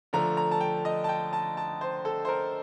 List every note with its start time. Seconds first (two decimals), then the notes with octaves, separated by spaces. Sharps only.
0.13 D3 F3 A3 A#5
0.37 A#5
0.51 A5
0.61 G5
0.85 D#5
1.04 A5
1.09 G5
1.33 A5
1.57 A5
1.81 C5
2.05 A4
2.25 C5
2.28 A#4